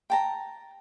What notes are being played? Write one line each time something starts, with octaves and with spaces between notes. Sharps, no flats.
G5 A5 A#5